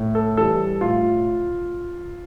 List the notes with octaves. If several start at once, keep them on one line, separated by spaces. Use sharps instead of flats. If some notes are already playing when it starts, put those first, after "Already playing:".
Already playing: A2
A4
E3 G3 A4
A2 F4